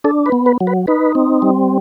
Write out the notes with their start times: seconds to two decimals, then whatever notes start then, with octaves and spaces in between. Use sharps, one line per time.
0.04 D4 A4
0.26 B4
0.32 B3
0.46 B4
0.60 F#3
0.67 B4
0.87 D#4 B4
1.15 C4
1.42 G3